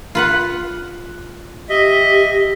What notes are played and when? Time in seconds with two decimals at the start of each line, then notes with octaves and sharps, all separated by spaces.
0.15 F4 B4 F#5
1.69 G4 D#5 E5